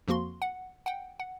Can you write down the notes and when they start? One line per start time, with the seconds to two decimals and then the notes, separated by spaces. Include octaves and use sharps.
0.08 F2 F3 A#3 F#4 C6
0.42 F#5
0.86 F#5 G5
1.20 F#5